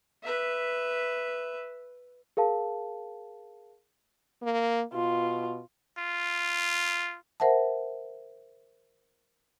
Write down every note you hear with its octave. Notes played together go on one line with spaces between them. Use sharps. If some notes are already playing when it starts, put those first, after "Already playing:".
B4 E5
G#4 A#4 F5 A5
A#3
B2 F4
F4
A#4 C5 E5 F#5 A5